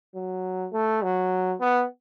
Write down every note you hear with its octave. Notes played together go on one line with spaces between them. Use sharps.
F#3
A3
F#3
B3